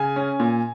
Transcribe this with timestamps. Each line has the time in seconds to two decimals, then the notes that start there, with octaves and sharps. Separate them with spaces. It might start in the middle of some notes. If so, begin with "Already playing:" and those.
Already playing: C#3 G#5
0.16 C#4
0.40 A#2